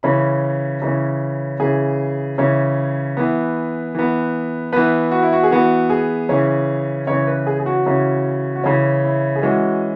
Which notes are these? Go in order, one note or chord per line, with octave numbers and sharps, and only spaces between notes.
C#3 E3 C#4 B5
C#3 E3 C#4
C#3 E3 C#4 G#4
C#3 E3 C#4
E3 B3
E3 B3
E3 B3 B4
F#4
E4
F#4
G#4
E3 B3 F#4
G#4
C#3 E3 C#4
C#3 E3 C#4 C#5
B4
G#4
G#4
F#4
C#3 E3 C#4
F#4
C#3 E3 C#4 E4
E4
G#4
E3 G#3 C#4 F#4